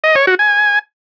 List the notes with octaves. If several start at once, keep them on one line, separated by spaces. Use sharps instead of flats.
D#5
C#5
F#4
G#5